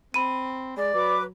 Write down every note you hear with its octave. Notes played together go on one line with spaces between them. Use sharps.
C4 B5 D#7
G#3 D5
F#3 B4 D6